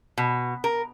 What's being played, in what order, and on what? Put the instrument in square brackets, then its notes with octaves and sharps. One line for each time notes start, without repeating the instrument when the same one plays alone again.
[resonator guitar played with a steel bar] B2
A#4